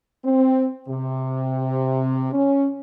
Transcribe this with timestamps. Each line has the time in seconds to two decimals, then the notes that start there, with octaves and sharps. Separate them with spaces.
0.24 C4
0.89 C3
2.33 C#4